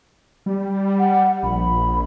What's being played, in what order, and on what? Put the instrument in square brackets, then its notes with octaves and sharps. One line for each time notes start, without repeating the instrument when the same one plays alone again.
[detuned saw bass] G3
[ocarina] F#5
[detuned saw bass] A#1 [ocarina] B5